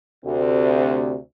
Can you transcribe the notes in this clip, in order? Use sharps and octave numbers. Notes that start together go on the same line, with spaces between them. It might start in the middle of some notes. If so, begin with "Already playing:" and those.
D2 C3